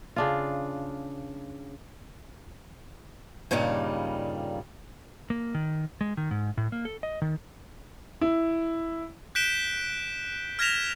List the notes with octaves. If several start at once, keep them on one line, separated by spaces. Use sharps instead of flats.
C#3 D4 F4
G2 A#2 C#3 G3 D#4
A#3
D#3
G#3
D#3
G#2
A2
A#3
A4
D#5
D#3
E4
F#6 G6 B6 D7 E7 G7
F6 G#6 A#6 B6 E7 F7